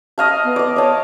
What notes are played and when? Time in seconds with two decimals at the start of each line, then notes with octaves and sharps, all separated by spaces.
0.18 D#5 F5 A5
0.44 B3
0.56 D5 D#5
0.76 C#5 D#5 A5